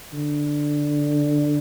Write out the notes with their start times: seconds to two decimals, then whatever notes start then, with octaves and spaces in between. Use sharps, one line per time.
0.13 D3